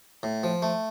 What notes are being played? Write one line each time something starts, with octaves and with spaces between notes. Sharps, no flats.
A2
F3
A3